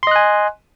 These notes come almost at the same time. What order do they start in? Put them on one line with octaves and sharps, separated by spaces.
C6 D#5 F#6 G#5